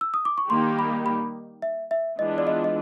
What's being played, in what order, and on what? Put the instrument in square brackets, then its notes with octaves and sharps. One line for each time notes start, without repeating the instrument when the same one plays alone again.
[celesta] E6
D#6
D6
C#6
[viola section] D#3 G3 A#3 D#4 G4 [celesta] C6
[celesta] B5
B5
E5
E5
[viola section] E3 G#3 B3 D4 F4 [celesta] D#5
[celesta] D5
D#5
D#5